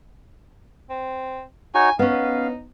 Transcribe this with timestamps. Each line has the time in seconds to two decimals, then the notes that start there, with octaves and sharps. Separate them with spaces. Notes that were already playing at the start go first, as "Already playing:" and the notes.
0.90 C4
1.75 D#4 F#4 C#5 G#5
1.99 B3 C#4 D#4 F5